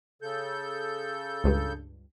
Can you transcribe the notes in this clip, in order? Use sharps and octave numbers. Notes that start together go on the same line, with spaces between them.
C#3 A4 G6
C#2 G2